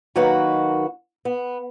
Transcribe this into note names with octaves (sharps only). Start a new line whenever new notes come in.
D#3 F#3 A#3 D#4 F#4 B4
B3